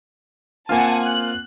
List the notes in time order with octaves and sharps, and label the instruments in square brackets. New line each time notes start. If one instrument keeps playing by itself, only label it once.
[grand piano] A#3 C4 F4 [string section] F#5 G#5 A5
[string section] F#6